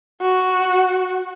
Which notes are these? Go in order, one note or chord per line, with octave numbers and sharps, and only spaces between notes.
F#4